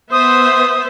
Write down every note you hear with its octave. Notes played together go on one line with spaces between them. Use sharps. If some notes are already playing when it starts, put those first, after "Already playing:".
B3 C5 E5 D#6